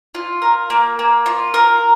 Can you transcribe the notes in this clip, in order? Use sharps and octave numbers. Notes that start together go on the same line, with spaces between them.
F4
A#4
A#3
A#3
F4
A#4